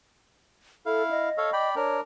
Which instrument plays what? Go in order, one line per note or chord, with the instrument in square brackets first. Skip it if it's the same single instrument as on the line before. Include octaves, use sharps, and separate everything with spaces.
[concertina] E4 F5 [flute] A4
[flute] D#5
[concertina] A4 C#5 F5
D5 G5 B5
[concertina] D4 A#4 [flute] C#5